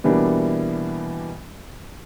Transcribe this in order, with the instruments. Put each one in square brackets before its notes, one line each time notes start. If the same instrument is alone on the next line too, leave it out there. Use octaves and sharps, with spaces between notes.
[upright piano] B2 E3 G3 A#3 D4